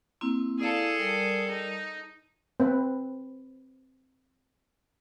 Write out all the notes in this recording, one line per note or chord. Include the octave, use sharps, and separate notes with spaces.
A#3 C4 E4
E4 G#4 A4 D5 F5
G3 A#4 D5
D#4
C4 B4